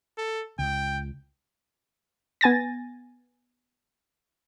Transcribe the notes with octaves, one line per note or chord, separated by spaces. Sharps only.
A4
C#2 G5
B3 G#5 A6 A#6